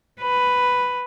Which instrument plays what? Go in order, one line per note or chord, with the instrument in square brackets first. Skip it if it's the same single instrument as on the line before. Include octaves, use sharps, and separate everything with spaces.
[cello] B4